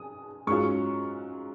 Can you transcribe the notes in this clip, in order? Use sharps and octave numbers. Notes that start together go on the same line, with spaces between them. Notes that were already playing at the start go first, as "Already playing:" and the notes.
Already playing: D#6
G#2 F#3 C#4 F4 C#6